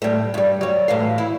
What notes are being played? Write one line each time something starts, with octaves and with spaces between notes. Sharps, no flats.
A2 G3
G2 G3
F#3 G3
A2 E3 F5
E4